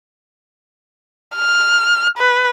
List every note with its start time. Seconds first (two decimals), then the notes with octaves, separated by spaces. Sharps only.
1.36 F6
2.18 B4